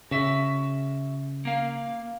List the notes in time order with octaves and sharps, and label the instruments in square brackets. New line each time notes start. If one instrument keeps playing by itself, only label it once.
[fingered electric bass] C#3 [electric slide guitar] F#4 E5
[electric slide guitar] A#3 F5